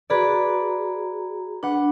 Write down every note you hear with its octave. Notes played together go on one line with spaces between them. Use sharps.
F#4 G#4 B4 D5 A#5
D4 B4 F#5